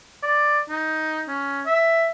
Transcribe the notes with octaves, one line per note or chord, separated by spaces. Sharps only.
D5
D#4
C#4
E5